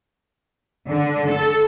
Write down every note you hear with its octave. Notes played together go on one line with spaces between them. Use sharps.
D3
A4